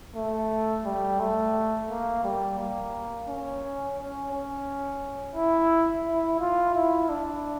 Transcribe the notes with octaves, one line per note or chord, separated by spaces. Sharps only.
A3
G3
A3
A#3
G3
A#3
C#4
C#4
C#4
E4
E4
F4
E4
D4